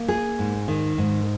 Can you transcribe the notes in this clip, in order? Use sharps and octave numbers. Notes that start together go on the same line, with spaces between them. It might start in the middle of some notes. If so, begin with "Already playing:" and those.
Already playing: A#3
G#4
G#2
D#3
G#2